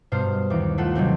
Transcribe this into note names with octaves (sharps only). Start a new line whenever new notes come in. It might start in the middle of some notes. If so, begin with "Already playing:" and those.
G2 B2 C5 F6
D#2 E3 D6
A3 F4 A4 F#5
C3 D#3 F#3 G3 C4